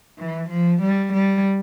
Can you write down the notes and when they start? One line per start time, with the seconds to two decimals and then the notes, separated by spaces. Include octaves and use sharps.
0.19 E3
0.50 F3
0.82 G3
1.14 G3